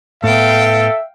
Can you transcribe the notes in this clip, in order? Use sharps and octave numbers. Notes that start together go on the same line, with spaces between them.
A2 B3 A4 E5 F5 G5